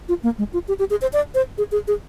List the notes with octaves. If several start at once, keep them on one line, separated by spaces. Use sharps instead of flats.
F4
A#3
G#3
F4
G4
G4
G#4
C5
D5
C5
G#4
G#4
G#4